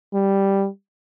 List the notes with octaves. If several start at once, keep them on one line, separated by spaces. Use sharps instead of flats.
G3